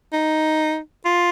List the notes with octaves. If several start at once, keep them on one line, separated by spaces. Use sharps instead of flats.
D#4
F4